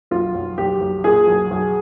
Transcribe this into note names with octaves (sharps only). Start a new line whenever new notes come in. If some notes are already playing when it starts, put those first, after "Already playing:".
B1 F4
B1
B1 G4
B1
A#2 G#4
B1
B1